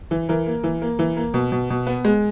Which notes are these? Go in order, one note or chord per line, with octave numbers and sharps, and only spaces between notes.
E3
E3 A#4
A#3
E3
A#3
E3
A#3
B2
B2
B2
B3
G#3